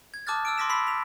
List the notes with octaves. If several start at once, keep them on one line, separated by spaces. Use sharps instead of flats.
G#6
A5 D6 D#6 F6 F#6 A6
E6 F6 D7
C6 D6 A#6 B6 E7
B5 C6 E6 B6 C7
B6 F7